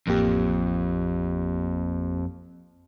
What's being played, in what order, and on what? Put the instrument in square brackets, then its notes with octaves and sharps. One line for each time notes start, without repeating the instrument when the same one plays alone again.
[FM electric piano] A1 A#3 G4 [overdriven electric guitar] F2